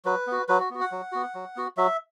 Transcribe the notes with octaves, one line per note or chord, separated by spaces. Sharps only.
F#3 B4
B3 F#4
F#3 B4
F#4
B3 F#4
F#5
F#3
B3 F#4
F#3
B3 F#4
F#3 E5